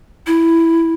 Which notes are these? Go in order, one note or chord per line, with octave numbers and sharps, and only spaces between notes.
E4